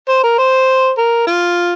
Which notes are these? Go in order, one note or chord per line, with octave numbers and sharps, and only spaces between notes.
C5
A#4
C5
A#4
F4